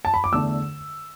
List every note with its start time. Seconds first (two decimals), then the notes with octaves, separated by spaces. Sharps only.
0.05 A5
0.14 B5
0.24 D6
0.32 E2 D3 A3 D4 E6